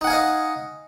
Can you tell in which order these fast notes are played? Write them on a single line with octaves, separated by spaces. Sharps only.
D#4 F#5 G#5 F5 D#5